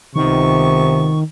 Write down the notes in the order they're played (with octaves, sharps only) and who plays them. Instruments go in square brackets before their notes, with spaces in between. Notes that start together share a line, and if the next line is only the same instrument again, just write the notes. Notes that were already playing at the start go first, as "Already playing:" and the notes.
[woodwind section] C#2 B3 C#6 [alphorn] C3 [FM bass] D#3